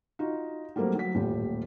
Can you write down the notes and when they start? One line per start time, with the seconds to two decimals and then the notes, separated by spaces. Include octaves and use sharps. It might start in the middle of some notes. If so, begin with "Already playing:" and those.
0.19 D#4 F4 F#4
0.76 F#3 G3 A3 A#3 C4
0.95 F#3 B6
1.15 D#1 A1 G4